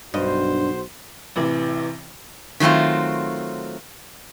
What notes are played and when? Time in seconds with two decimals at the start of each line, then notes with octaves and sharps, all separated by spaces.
0.14 B1 G2 F#4 C5 D#5
1.36 A1 C3 E3
2.60 D#3 F#3 A3 C4 F4